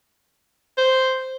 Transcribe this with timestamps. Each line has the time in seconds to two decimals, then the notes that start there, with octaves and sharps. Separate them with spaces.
0.78 C5